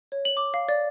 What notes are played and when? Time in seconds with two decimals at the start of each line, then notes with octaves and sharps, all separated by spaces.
0.12 C#5
0.25 F#7
0.37 D6
0.54 F5
0.69 D5